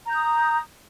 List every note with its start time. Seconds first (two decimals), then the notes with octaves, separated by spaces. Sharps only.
0.05 A#5
0.10 G6
0.14 D#6